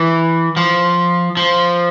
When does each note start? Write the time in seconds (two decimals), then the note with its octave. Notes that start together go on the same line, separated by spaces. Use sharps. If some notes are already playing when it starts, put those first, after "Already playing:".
Already playing: E3
0.57 F3
1.37 F3